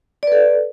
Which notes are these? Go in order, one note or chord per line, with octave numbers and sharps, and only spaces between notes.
A4 B4 D5